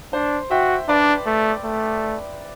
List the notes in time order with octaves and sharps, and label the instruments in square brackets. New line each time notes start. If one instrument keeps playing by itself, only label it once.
[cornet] D4 [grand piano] C5
[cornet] F#4 [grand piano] E5 G5
[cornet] D4 [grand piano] B4 D5
[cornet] A3
A3